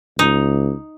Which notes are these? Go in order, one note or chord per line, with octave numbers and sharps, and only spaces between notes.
C#2 D#4